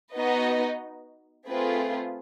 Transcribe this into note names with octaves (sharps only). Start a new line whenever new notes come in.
B3 D#4 F#4 B4 D#5
A3 C4 F4 G#4 B4